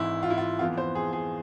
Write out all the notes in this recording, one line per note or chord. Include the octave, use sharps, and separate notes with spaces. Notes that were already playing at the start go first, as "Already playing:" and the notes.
Already playing: G#1 G#2 E3 E4
F4
E4
F4
F2 E3 B3 F4
C5
G#4
G#4